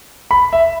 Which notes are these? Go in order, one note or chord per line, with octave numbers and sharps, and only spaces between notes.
B5
E5